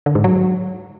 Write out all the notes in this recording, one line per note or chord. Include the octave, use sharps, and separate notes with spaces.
D3
G#2
F#3